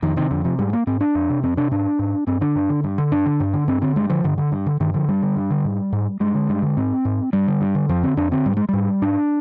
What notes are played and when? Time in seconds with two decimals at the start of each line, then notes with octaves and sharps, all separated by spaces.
0.02 F2 D#3
0.16 C3 D#3
0.31 F2 D3
0.44 C3 F3
0.59 G#2 G3
0.73 A#3
0.87 G#2 C4
1.01 D4
1.15 F2
1.30 C3
1.43 F2 C4
1.57 C3 D4
1.71 G#2 D4
1.99 G#2
2.27 G2 C4
2.41 D3 D4
2.55 G2
2.69 D3
2.84 G2
2.98 D3
3.12 G2 D4
3.26 D3
3.40 G2
3.54 D3
3.68 G2 C4
3.82 D3 C4
3.96 G2 G#3
4.10 D3 F3
4.24 G2 D3
4.38 D3
4.52 G2
4.66 D3
4.80 G2 D#3
4.94 D3 F3
5.08 G2 G3
5.22 D3
5.36 G2
5.51 D3
5.65 G#2
5.92 G#2
6.20 G2 G#3
6.34 D3
6.49 G2
6.62 D3
6.77 G#2 C4
7.05 G#2
7.33 G2 G3
7.47 D3
7.61 G2
7.75 D3
7.89 F2 F3
8.03 D3 C4
8.17 F2 D4
8.32 D3 C4
8.45 G#2 G3
8.57 G#3
8.69 G#2 G3
9.02 G#2 D4